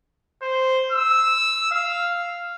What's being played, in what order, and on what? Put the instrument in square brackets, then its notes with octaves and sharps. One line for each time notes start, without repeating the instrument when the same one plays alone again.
[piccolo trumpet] C5
E6
F5